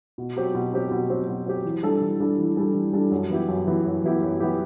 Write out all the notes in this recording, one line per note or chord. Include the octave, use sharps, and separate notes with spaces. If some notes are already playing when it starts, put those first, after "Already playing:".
B2
F#3 C4 G4
B2
F#3 C4 G4
B2
F#3 C4 G4
B2
F#3 C4 G4
E3
G3 D4 A4
E3
G3 D4 A4
E3
G3 D4 A4
E3
G3 D4 A4
F#2
E3 B3 E4 G4
F#2
E3 B3 E4 G4
F#2
E3 B3 E4 G4
F#2
E3 B3 E4 G4